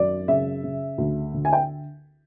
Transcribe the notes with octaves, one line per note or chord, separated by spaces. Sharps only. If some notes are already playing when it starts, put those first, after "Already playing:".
Already playing: G#1 F#2 D5
C#3 E5
C#3
D2
D3
G#5
G5